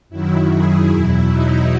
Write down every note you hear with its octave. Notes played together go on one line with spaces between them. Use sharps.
F#2 D#3 F#3 E4
G#4
E2 B2 F#3 E4
D#4